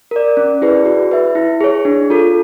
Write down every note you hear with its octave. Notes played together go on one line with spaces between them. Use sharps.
A#4 D5
C#4
E4 G#4 B4 D5
F#4
B4 E5
E4
G#4 C#5
D4
F4 A4